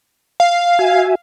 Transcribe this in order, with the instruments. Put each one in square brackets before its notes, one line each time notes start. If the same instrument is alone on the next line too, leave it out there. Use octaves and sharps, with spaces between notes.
[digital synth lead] F5
[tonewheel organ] F#4 E5 G#5